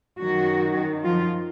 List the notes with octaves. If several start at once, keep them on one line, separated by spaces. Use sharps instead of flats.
F#2 D#3 F#3 F#4
F3 F4